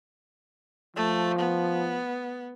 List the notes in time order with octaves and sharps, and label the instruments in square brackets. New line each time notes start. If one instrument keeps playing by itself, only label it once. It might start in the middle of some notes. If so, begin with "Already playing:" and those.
[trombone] F3 [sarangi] A3
[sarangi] B3